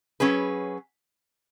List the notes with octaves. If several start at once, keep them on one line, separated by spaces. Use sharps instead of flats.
F#3 C#4 G#4 B4